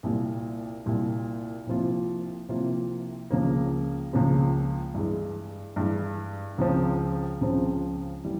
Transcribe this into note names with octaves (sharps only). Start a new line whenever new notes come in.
C2 A#2 G3
C2 A#2 G3
C2 C3 F3 A#3 F4
C2 C3 F3 A#3 F4
C#2 C#3 F3 A#3
C#2 C#3 F3 A#3
G2 E3 G#3
G2 E3 G#3
C#2 C#3 F3 C4
C#2 C#3 F3 C4
E3 G3